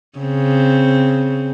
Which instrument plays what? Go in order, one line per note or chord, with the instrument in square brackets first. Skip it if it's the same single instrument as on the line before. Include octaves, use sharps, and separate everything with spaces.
[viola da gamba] C#3 C4